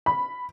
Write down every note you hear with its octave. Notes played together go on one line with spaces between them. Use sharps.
B5